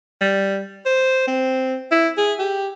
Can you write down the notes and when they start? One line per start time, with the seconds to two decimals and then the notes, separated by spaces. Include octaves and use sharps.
0.21 G3
0.86 C5
1.27 C4
1.92 E4
2.17 G#4
2.39 G4